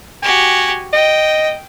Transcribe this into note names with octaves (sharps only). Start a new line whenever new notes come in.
F#4 G4 G#5
D#5 G5